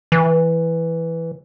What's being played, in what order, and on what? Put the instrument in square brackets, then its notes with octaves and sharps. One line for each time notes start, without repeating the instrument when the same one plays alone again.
[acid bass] E3